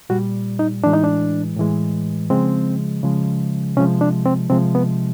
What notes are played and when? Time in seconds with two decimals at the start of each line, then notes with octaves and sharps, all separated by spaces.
0.09 A#2 G3 F#4
0.59 D#4
0.83 A2 E3 G#3 D4
0.93 D#4
1.04 D4
1.56 A2 E3 G#3
2.30 C#3 F3 G#3 C4
3.03 C#3 F3 G#3
3.77 C3 F3 G#3 C#4
4.01 D4
4.26 C4
4.50 C3 F3 G#3 C4
4.75 B3